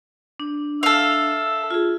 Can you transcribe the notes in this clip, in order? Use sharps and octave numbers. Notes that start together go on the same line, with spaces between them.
D4
A4 E5 F5
F4 G#4